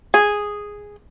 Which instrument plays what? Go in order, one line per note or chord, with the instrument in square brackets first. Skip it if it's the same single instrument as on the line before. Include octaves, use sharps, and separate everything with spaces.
[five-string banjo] G#4